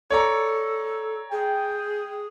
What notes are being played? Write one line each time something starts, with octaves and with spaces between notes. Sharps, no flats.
A4 C#5 D5 A#5
G#4 G5